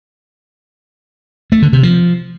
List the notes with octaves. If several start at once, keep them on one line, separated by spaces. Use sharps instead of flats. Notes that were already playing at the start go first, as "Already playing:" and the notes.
A3
D3
C3
F3